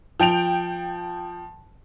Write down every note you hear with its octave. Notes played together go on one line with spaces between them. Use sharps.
F3 G5 D7 F7